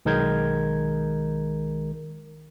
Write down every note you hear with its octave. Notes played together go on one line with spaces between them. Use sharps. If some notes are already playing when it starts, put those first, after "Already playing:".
B1 D#3 G#3 A#4 G6 G#6